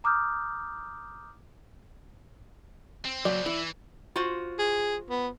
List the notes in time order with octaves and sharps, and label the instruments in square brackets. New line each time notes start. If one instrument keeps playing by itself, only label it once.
[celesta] A#5 D6 D#6 F6 G6
[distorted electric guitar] C4
[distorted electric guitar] C#3 C4 [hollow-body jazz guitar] F#3 [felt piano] D5
[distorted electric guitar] E3 [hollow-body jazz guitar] E4
[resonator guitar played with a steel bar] F4 F#4 C5
[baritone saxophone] G#4
B3